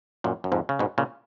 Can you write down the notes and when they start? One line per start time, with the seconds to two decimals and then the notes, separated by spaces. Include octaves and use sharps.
0.24 F#2 A#2
0.44 F#2
0.52 F2 G#2
0.69 C#3
0.79 G#2 B2
0.98 A#2 C#3